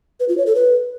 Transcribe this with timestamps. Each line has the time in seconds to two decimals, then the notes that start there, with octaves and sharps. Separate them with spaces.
0.20 B4
0.29 F4
0.38 C#5
0.46 A4
0.55 B4